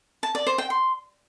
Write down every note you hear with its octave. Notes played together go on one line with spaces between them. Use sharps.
A5
D5
C5
G5
C6